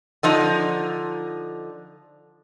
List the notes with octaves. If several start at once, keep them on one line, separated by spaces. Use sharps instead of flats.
D3 F3 D#4